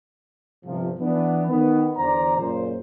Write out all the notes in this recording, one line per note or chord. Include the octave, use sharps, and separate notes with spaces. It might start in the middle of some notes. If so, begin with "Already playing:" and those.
G1 C3 F3
E3 B3 D4
D#3 B3
E2 D3 C5 D5 A#5
F#1 A#2 C#3 C5